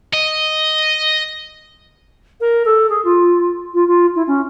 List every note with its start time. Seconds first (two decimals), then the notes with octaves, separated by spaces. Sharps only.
0.13 D#5
2.40 A#4
2.65 A4
2.89 G#4
3.04 F4
3.74 F4
3.87 F4
4.15 E4
4.27 C#4